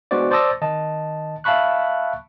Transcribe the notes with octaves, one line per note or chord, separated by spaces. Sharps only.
G#3 B3 D4 F#4 C5 D5
C5 D5 A5 D#6 E6 A#6
D#3 D#5 A5
E5 F5 A5 B5 C#6 F#6